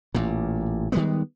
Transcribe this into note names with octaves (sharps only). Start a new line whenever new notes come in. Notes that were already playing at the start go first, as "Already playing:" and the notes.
A1 A#2
D#3 G3 G#3 B3